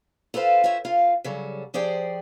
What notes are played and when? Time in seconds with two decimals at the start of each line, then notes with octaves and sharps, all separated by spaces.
0.34 F4 A4 B4 C5 F5
0.64 F4 C5 C#5 E5
0.85 F4 F5
1.24 C#3 F#3 G3 A4
1.74 F3 G4 G#4 C5 D5 G5